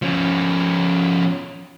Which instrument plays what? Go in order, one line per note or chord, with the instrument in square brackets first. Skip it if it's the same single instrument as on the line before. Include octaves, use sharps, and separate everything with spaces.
[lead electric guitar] F3 C#4